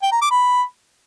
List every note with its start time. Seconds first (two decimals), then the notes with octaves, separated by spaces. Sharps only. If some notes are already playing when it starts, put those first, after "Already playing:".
0.03 G5
0.12 A#5
0.21 D6
0.31 B5